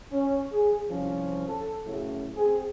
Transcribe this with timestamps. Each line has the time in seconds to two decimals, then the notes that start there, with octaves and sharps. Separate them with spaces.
0.11 C#4
0.52 G#4
0.89 C2 F3 C#4
1.48 A4
1.85 F#2 A2 C#3
2.36 C4 G#4